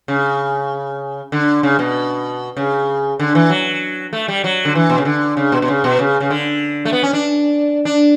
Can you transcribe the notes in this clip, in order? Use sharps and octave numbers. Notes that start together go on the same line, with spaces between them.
C#3
D3
C#3
B2
C#3
D3
E3
F#3
A3
G3
F#3
D3
E3
B2
C#3
D3
C#3
B2
B2
C#3
B2
C#3
C#3
D3
A3
B3
C#4
D4
D4